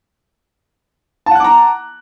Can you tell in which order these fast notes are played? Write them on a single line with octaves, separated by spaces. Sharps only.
A5 F#5 F#6 D6 A#5